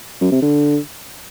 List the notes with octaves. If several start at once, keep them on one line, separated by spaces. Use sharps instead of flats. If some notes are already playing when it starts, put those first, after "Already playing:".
F#2
C3
D3